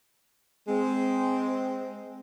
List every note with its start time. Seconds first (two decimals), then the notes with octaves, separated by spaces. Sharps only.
0.68 G#3 C4